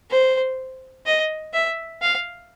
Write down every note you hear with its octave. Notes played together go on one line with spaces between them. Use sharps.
C5
D#5
E5
F5